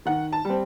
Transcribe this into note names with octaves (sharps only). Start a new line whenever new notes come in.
D#3 F#5
A5
G3 C4